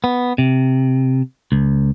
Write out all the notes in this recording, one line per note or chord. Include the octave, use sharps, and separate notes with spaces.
B3
C3
C#2